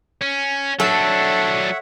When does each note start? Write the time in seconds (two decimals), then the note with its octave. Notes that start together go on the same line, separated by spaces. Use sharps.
0.22 C#4
0.80 F#3 D4 A4 C#5 E5 F#5